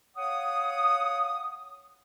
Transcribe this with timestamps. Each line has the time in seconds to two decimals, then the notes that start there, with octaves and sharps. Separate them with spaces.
0.16 C#5 F5 F#5 D#6